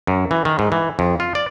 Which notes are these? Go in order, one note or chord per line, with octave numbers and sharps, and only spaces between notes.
F#2
E3
D#3
G#2
E3
F2
F4
D5